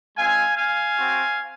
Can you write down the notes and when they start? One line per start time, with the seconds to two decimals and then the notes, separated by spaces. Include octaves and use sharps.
0.17 G#3 C4 F4 F5 G#5
0.56 F5 G#5
0.96 C4 F#4